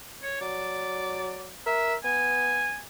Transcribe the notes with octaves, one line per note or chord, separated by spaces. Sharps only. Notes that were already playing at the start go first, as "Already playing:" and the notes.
C#5
F#3 D5
A#4 E5
B3 G#5